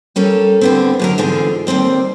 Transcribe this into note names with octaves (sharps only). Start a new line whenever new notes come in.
G3 C#4 A4 A#4
D3 B3 C4
F#2 D3 A#4
E2 G#2 D3 C4 F4 G#4
D#2 G3 C4 D5